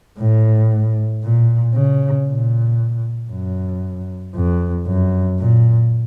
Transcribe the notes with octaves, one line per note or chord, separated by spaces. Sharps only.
A2
A#2
C#3
A#2
F#2
F2
F#2
A#2